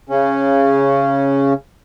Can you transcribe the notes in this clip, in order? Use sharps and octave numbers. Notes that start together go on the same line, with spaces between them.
C#3 C#4